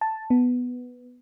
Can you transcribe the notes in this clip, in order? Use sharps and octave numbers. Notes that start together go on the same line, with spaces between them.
A5
B3